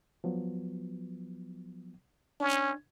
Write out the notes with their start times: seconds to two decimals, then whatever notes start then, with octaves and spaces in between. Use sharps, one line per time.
0.24 F3 F#3 B3
2.40 C#4 D4 G#6